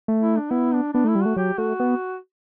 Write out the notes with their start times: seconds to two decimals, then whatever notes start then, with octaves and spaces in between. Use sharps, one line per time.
0.08 A3
0.22 E4
0.36 D4
0.51 B3 E4
0.73 D4
0.93 B3 D4
1.04 A3 E4
1.15 G3
1.23 A3 F#4
1.36 F#3 G4
1.58 A3 F#4
1.80 B3